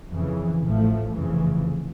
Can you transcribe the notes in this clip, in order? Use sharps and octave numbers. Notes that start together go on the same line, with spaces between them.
F2 C#3 E3
A1 A2 F3 A3
F1 F2 C#3 E3